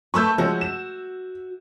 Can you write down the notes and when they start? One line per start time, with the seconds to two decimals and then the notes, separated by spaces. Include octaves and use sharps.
0.14 A3 A4 B4 C#6 E6 G6
0.38 F3 G#3 C#4 F#4
0.61 E7